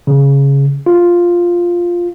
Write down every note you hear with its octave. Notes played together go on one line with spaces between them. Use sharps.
C#3
F4